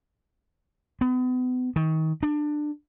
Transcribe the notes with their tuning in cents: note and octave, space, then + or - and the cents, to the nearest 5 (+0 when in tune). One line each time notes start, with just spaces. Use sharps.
B3 +35
D#3 +30
D4 +20